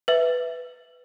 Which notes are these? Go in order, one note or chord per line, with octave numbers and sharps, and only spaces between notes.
B4 E5